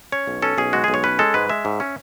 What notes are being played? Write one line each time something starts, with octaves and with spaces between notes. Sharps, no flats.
C#4 C#5
B1
C#4 A4
B1 G#4
G#3 F#4
B1 G#4
C#5
C#4 B4
G#3 A4
G#2 B4
G#3 E5
G#2
C#4